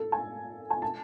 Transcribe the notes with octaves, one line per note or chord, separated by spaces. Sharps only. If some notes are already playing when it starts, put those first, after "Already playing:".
Already playing: A4
G#5
G#5
A5